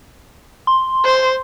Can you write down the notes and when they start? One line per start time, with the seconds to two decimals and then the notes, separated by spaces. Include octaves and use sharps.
0.67 C6
1.04 C5